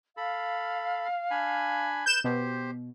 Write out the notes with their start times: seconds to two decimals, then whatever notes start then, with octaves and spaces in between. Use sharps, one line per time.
0.17 A4 F5 B5
1.31 D4 G#5 B5
2.06 B4 G6 E7
2.24 B2 G4 C5